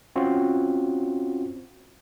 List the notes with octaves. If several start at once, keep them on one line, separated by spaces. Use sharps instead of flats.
C4 C#4 F4 F#4